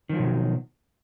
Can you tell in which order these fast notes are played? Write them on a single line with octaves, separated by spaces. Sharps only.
D#3 F3 F#3 B2